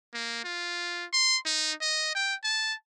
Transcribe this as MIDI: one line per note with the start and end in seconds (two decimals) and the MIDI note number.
0.13 0.43 58
0.44 1.05 65
1.13 1.37 84
1.46 1.72 63
1.81 2.13 75
2.15 2.35 79
2.43 2.73 81